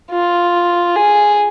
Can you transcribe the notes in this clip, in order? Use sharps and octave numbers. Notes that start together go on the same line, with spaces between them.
F4
G#4